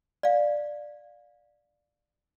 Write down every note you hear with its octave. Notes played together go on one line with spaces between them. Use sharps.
D5 F5